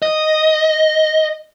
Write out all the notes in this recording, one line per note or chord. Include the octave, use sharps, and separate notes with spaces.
D#5